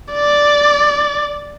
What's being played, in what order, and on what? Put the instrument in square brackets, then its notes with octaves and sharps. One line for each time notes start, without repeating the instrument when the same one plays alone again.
[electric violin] D5